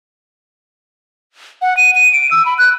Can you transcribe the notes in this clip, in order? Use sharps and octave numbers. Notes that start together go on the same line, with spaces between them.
F#5
D#7
D#7
D7
E6
B5
F#6